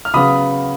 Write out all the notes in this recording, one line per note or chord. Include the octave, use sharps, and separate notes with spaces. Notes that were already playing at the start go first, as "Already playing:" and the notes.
F6
C#3 F#3 B3 B5 D#6